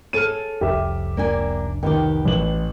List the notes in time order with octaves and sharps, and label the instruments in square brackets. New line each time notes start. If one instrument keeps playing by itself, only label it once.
[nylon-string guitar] G#4 A4 C#5 [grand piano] F6 D#7
[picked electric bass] F1 C2 F2 [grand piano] G4 E5
[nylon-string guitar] A#3 D4 G#5
[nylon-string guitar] B2 B3 G4 [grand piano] D#3
[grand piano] A1 F#7